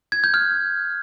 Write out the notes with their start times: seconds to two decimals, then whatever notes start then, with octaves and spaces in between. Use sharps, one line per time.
0.12 G#6
0.24 G6
0.34 F6